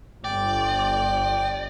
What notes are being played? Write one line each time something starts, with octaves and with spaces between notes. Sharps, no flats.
G1 D5 G5